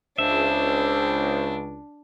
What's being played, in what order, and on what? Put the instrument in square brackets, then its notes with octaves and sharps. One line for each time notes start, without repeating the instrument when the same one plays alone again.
[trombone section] C#2 [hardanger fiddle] D4 [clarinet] C5 [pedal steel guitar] E5